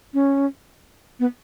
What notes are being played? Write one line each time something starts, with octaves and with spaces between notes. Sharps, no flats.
C#4
B3